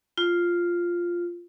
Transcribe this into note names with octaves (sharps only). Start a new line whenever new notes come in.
F4